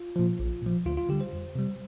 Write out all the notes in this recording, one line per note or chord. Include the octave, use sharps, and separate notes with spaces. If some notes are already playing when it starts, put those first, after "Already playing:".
Already playing: F4
A#2 F3
A#1
A#2 F3
D2 F4
F4
D3 G3 G4
C5
F2
C3 G3